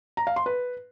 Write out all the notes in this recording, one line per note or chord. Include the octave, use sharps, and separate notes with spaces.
A#5
F5
C6
B4